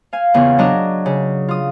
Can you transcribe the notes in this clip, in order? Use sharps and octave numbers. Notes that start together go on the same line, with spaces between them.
F5 G#5
E2 C#3 B3 F4 G#5
F#3 D4 D#5 A#5 F#6
C#3
F4 D#6